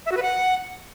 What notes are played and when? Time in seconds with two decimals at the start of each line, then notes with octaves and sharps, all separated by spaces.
0.06 E5
0.11 F#4
0.17 B4
0.22 F#5